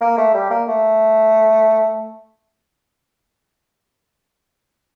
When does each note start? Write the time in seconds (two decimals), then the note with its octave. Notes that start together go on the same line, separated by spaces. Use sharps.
0.01 A#3
0.18 A3
0.34 G3
0.50 A#3
0.68 A3